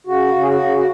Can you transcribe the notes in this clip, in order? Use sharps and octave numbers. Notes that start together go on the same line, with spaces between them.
C#3 F#4
C#3
G#4
F#4
C#3
F#4